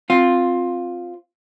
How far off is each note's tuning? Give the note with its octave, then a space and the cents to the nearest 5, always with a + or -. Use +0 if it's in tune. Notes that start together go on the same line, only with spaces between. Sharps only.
C4 +0 F4 +10